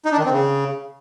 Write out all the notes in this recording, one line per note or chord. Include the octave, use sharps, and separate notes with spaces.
D#4
D4
D#3
C4
C#3